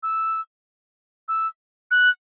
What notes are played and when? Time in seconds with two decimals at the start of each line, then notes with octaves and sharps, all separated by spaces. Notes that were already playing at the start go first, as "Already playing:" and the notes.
0.03 E6
1.28 E6
1.91 F#6